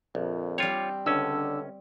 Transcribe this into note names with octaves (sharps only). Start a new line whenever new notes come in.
A#1 F2
G3 C4 F4 C#5
C#2 D3 C#4 D4 E6